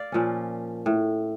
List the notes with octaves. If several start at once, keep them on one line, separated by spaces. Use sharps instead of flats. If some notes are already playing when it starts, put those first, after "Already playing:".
Already playing: D5 F5
A#2 F3 C#4
A2